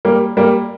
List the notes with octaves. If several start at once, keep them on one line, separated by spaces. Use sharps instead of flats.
G3 A#3
G3 A#3